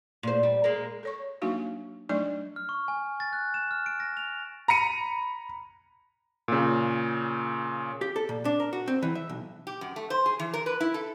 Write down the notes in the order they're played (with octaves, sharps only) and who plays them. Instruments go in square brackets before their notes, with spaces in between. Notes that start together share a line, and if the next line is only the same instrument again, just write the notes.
[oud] A#2 C5
G3
G#3 A#3
[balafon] A4 C#5 C#6
F#3 A#3 D4 D#4 F#4 F5
F#3 A3 D4 D#4 D5 D#5
[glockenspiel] F6
C#6
G#5
A6
F#6
E7
F6
D7
A#6
F7
[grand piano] A#5 B5 C#7 D#7
[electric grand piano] A#2 C#3
[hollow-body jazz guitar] G4
A4
A#2
D4
A#4
F#4
C4
E3
E5
B1
[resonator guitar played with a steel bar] G4
F#2
A3
C5
G#4
E3
A#4
B4
E4
A4